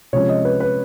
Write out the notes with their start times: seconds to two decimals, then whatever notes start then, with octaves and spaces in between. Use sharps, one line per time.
0.13 C3 F3 G#3 C#4 C#5
0.29 D#5
0.45 B4
0.60 B4